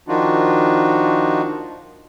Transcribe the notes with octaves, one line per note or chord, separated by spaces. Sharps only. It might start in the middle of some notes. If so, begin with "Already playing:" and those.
D#3 F3 D4 D#4 F4 F#4